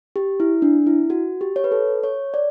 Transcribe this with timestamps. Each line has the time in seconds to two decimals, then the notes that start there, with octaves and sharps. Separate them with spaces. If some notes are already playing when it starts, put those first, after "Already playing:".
0.16 G4
0.40 E4
0.62 D4
0.87 E4
1.10 F#4
1.41 G4
1.56 C#5
1.64 B4
1.72 A4
2.03 C#5
2.34 D5